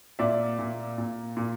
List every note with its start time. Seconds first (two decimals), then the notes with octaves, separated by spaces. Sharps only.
0.19 A#2 D5 E5
0.59 A#2
0.98 A#2
1.37 A#2